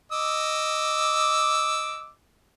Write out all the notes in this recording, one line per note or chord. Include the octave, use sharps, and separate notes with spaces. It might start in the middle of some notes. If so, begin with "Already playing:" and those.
D#5 D6 E6